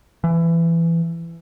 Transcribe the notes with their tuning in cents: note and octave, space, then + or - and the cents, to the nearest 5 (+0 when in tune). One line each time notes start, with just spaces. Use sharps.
E3 +20